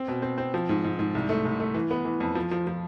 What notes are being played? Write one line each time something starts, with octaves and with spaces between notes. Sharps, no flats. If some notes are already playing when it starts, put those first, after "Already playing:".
Already playing: C4
B2
C4
C4
F3
G#2
G#2
G#2
C2
A3
C2
A3
E3
B3
E3
F2
F3
F3
F3